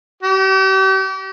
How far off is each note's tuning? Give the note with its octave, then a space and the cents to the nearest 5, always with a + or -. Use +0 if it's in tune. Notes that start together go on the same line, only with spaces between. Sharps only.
G4 -40